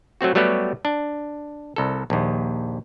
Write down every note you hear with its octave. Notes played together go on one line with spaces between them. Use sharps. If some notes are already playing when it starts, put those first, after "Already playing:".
F#3 A3 C4 F#4
F#3 G3 A3 B3 F#4 G4
D4
C2 A4
A#1 D#2